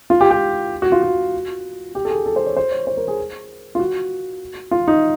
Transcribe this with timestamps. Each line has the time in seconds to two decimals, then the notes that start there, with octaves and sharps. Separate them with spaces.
0.10 F4
0.21 G4
0.31 G4
0.82 F#4
0.92 F4
1.02 F#4
1.95 G4
2.05 A4
2.10 G#4
2.26 A4
2.36 C5
2.46 C#5
2.56 C5
2.72 C#5
2.87 C5
2.97 A#4
3.08 G#4
3.75 F4
3.79 F#4
4.71 F4
4.87 D#4